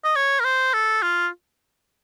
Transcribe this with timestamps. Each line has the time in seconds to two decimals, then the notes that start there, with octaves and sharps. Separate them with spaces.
0.04 D#5
0.16 C#5
0.40 A#4
0.44 C5
0.73 A4
1.02 F4